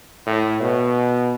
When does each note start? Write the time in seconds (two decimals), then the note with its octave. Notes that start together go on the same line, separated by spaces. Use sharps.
0.27 A2
0.61 B2